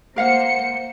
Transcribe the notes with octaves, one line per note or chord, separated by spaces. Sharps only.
A#3 A#4 C5 F5 F#5 C#7